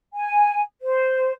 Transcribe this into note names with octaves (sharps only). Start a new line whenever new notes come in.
G#5
C5